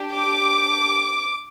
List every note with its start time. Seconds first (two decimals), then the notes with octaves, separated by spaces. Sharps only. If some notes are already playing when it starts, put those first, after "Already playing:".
Already playing: D4 G4
0.14 D6